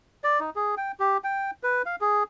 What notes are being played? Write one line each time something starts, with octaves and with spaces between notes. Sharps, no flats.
D5
D#4
G#4
G5
G4
G5
B4
F5
G#4